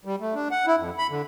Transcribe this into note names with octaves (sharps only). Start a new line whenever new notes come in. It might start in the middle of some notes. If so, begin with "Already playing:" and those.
G3
A3
D4
F#5
E4
F2
B5
D3